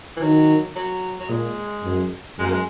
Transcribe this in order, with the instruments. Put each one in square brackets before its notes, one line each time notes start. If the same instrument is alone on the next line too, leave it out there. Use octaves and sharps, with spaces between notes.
[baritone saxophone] E3
[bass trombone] D#3 [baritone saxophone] F#3
[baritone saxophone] F#3
F#3
[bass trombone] A#2 [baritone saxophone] G#3
[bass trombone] F#2
[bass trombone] F#2 [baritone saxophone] G#3
[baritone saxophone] A#3
G#3